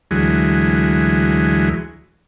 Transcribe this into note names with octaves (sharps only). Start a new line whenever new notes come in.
D2 E3 F#3 G#3